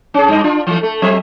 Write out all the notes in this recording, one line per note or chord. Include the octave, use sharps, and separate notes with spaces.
C#4 G#4
G2 D#5
D4 F4
E3 A3
A3
F#3 C4 E5